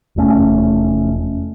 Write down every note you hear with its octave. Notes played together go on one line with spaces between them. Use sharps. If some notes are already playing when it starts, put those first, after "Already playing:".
F1 E2 A3 C#4